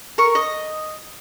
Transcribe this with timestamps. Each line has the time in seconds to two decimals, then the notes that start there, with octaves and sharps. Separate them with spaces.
0.18 A#4 C#6
0.35 D#5